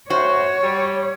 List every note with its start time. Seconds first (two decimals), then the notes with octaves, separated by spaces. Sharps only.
0.10 F#2 A2 F#4 C5 C#5
0.63 G3